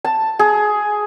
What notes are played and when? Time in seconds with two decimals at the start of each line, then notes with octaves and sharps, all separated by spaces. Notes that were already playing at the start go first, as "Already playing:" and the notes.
0.05 A5
0.39 G#4